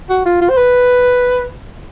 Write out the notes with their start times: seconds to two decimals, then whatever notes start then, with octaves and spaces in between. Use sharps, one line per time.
0.10 F#4
0.26 F4
0.41 F4
0.49 C5
0.58 B4